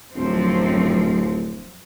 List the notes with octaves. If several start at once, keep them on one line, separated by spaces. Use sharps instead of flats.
D1 F#2 F3 C4